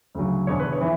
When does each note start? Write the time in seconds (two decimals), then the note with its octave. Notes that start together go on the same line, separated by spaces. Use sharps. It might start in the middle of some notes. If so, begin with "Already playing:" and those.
0.15 D2 C#3 F#3
0.47 E1 E2 D3 C#5
0.60 B4
0.72 C#5
0.81 E3 B3